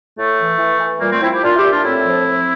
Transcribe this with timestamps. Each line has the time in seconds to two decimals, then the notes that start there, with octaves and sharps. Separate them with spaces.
0.17 A2 A3
0.39 E3
0.59 E3
0.80 E3
1.01 A#2 G3 A#3
1.11 A3 C4
1.21 F3 C4 E4
1.31 E4 G4
1.43 A#2 D4 F4
1.56 E4 G4
1.63 A#2
1.70 D4 F4
1.84 A2 C4 E4
2.05 F3
2.26 F3